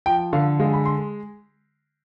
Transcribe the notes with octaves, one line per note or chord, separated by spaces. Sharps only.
F3 G5
D3 F5
G#3 F5
B5
C6